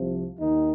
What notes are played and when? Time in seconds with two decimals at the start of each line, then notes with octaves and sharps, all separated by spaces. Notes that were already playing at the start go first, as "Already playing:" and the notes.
Already playing: C2 C3 F3
0.38 D#2 D#3 D#4